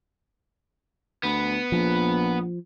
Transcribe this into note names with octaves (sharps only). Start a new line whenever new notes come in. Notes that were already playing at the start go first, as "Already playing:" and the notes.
D2 B3
A#1 F3